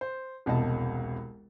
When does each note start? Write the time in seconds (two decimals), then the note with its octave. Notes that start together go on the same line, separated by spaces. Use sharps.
0.01 C5
0.46 E1 C2 B2 D#5 A5